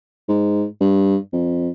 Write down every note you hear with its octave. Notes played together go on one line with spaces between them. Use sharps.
G#2
G2
F2